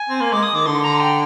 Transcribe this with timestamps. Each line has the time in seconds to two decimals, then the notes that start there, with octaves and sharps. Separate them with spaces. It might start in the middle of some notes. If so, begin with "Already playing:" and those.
Already playing: G#5
0.09 C4
0.21 A#3
0.33 G#3 D6
0.43 D#6
0.54 D#3 D6
0.66 D3 C6
0.83 A#5
1.00 G5